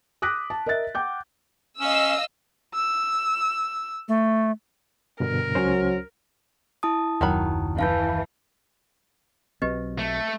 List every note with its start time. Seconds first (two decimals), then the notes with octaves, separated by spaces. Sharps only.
0.22 D6 D#6 F#6 A#6 B6 D7
0.50 A5
0.66 A#4 D#5 E5 F#6 A6
0.95 F#5 G5 D6 G6
1.81 C#4 D#5 F5 E6
2.75 E6
4.08 A3
5.20 G2 B2 D3 A#4
5.55 C#2 F#3 C#4 C5
6.83 E4 A5 D#6
7.21 F#1 D#2 D#3 F#3 B5
7.79 E3 F5 A5 G6
9.62 B1 F#3 C4 G4 B4 D#5
9.99 A3